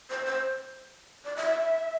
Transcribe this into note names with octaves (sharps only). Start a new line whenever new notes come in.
C5
C5
D5
E5